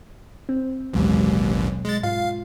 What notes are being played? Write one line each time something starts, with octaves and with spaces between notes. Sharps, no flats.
C4
A1 D#2 B2 F#3 G#3
G#3 A6
G#2 F4 F5